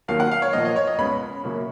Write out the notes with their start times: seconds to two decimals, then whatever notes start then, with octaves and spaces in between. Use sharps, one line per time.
0.08 D#2 D#3 F#3 A#3 F5
0.20 F#5
0.31 F5
0.42 C#5
0.53 A#2 F3 A#3 D#5
0.65 D#5
0.76 C#5
0.87 D#5
0.98 C#2 C#3 G#3 B3 B5
1.44 F#2 C#3 F#3 A#3